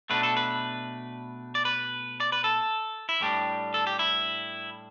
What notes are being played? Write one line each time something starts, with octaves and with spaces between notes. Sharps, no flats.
B2 A3 D4 B4
A4
B4
D5
B4
D5
B4
A4
E4
A2 G3 D4 G4
A4
G4
E4